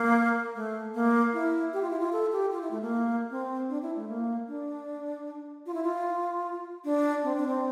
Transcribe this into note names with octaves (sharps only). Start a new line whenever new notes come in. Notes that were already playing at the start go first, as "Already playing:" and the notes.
Already playing: A#3
A3
A#3
E4
G4
F4
E4
F4
A4
G4
F4
E4
A3
A#3
C4
D4
E4
A3
A#3
D4
F4
E4
F4
D4
C4
D4
C4